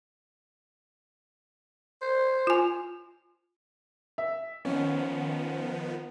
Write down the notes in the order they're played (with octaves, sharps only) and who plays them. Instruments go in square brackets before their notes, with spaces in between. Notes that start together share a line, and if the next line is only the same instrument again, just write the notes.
[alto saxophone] C5
[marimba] F4 G#5
[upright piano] E5
[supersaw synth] D#3 F3 B3 [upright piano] C#4